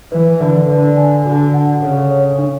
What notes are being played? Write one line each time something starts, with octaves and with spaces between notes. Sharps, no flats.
E3 B4
D3 B4
D3 D5
G#5
D3 F#4
F#5
C#3 A4
C#5
D4